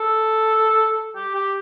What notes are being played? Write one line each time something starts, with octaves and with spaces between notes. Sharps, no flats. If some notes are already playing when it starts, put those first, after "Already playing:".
Already playing: A4
G4
G4